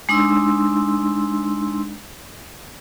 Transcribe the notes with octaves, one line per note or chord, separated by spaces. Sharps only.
G#3 D4 D#4 C6 E6